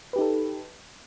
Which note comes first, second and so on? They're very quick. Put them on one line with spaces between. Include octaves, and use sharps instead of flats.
B4 G4 D#4 A4